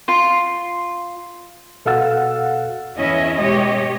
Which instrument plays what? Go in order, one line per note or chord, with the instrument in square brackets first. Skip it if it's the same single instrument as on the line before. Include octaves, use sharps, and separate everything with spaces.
[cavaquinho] F4 C6
[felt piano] B2 A4 F5 F#5 E6 A6
[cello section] E2 C#4 E4 D#5 E5
B2 G#3 G4 C#5 D#5